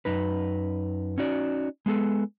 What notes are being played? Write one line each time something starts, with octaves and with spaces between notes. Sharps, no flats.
F#2 D#4 B4
C#4 D#4 F#4 D5
G#3 B3 G#4 A4